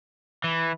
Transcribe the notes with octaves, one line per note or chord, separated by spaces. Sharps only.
E3